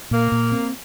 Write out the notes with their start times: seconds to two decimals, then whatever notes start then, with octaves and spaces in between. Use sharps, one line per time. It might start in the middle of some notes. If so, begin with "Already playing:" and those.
0.11 A#2 A#3
0.32 A#2
0.52 C4